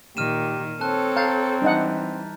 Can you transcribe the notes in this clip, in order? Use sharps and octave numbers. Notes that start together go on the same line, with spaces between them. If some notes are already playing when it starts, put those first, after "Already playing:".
A#2 D#3 G4 F6 D#7 E7
C4 A4 C#5 A5 F#6
F5 A#5 G6 A6
E3 G3 D4 D#4 F#5